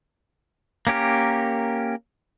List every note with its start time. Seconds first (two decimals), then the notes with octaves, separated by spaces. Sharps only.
0.87 A#3 C#4 G4 A#4